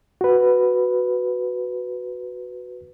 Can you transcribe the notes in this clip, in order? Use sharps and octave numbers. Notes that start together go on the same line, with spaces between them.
F#4 B4